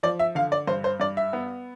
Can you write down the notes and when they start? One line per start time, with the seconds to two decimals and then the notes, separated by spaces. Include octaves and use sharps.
0.03 F3 D5
0.19 E5
0.35 D3 F5
0.52 D5
0.67 G2 C5
0.84 C5
1.00 G2 D5
1.17 E5
1.33 B3